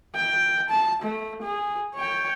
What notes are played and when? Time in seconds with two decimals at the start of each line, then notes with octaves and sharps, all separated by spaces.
0.16 G5
0.70 A5
1.02 A3
1.42 G#4
1.95 C#5 G5